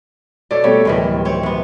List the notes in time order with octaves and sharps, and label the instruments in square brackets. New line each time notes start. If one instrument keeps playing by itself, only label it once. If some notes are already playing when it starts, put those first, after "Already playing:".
[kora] B2 A4 C#5 [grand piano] D5
[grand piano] B2 A3 C#5 [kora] G3
[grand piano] D1 [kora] G2 D#3 E3
[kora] C4 C#5
C3 B3